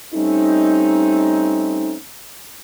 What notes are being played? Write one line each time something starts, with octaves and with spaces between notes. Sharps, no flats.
G3 A3 C4 C#4 D#4